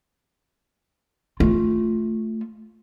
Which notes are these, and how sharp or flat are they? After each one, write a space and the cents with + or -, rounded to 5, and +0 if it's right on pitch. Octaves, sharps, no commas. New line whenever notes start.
A3 +0 F4 +0